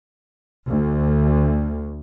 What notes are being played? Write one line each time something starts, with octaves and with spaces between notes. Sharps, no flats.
D2